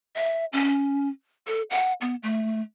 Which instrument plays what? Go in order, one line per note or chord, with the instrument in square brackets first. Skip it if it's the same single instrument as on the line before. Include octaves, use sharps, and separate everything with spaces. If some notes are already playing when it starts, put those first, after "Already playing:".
[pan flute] E5
C#4
A4
F#5
B3
A3